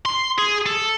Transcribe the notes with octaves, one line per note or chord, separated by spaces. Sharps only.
C6
G#4
A4